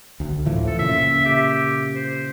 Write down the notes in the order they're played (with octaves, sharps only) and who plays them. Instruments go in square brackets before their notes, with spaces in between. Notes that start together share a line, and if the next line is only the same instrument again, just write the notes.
[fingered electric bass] D2
A2 E3 F3
[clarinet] A4
[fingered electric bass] A#2 C#3 [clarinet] E5
[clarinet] G4
C5